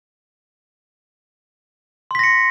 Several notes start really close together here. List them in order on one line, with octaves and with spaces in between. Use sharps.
C6 B6 A#6 C#7